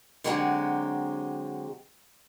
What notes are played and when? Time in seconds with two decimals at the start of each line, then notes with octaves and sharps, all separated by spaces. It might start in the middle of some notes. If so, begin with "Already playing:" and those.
0.24 D3 F#3 G#3 C4 E4 G4